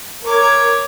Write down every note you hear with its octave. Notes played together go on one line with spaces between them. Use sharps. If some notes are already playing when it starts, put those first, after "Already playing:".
A#4 C#5 D6 G#6